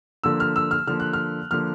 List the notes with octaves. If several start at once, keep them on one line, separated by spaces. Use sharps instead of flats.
D3 F3 A#3 E6
F6
E6
F6
D3 F3 A#3 F6
F#6
F6
D3 F3 A#3 F6